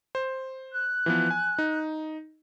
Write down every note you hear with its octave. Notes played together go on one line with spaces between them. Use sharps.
C5
F#6
E3 F3 B3
G#5
D#4